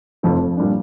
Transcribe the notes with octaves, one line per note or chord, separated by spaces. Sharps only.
F1 F2 F3 C4 F4
A#2 G3 D4